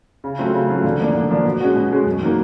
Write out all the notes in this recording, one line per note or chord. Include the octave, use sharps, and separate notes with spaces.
C#3
F#3 A3 C4 F4
C#3
F#3 A3 C4 F4
D3
F3 A#3 D4
D3
F3 A#3 D4
B2
G#3 C#4 F#4
B2
G#3 C#4 F#4
F#2
D#3 F#3 A#3